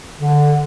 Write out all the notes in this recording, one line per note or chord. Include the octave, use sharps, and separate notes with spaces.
D3